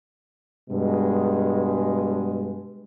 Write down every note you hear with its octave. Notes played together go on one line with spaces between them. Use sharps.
G2 B2 G#3